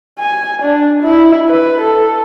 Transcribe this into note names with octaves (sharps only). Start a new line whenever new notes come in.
G#5
D4
E4
B4
A4